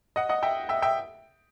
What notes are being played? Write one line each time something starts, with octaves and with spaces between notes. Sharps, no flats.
D#5 F#5
D#5 F#5
E5 G5
E5 G5
E5 G5